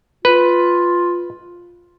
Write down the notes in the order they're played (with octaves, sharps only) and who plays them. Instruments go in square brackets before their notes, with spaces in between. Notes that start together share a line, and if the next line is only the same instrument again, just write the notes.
[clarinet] F4 [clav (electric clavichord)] B4